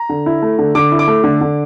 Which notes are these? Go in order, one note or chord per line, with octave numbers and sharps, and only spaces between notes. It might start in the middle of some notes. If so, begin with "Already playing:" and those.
Already playing: A#5
D3
E4
A3
D3
D3 D6
E4
D6
A3
D3
D3